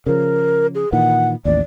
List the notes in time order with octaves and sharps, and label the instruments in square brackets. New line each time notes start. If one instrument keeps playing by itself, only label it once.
[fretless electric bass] C#3 F3 [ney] A#4
[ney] G#4
[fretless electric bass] A#2 D#3 E3 [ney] F#5
[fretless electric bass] A1 D#2 [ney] D5